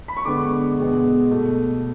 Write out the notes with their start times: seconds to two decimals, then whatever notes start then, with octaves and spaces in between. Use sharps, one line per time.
0.08 B5
0.17 C#6
0.25 D3 G#3 B3 D6
0.78 B2 G#3 B3
1.31 B2 A3